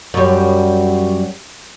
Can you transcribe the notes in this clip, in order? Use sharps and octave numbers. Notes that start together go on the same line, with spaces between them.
F#2 G3